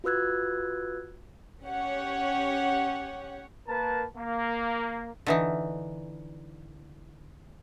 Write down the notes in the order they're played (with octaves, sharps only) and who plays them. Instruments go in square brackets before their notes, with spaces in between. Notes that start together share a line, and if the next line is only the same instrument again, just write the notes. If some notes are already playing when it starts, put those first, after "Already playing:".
[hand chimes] F4 F#4 B4 E6 F#6 G#6
[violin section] C#4 G4 C#5 F#5
[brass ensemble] A#3 A#4 B4 A5
A#3
[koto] D3 E3 D#4